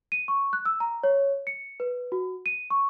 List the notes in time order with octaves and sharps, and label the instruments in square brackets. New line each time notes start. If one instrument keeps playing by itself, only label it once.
[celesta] D#7
C#6
F#6
E6
A#5
C#5
C#7
B4
F#4
D#7
C#6